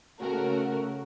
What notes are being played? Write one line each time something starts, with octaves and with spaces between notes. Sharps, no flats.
C#3 A3 F#4 A#4